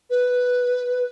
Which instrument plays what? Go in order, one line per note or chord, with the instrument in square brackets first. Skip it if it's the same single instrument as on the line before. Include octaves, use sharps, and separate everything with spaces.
[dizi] B4